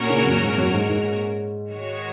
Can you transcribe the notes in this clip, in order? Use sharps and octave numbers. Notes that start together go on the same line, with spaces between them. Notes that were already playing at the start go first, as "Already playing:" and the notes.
Already playing: A#2 A#3 C#4 F#4 A#4
C#3
F#2
G#2
F#2
G#2
G#2
D#3 G#3 F#4 C#5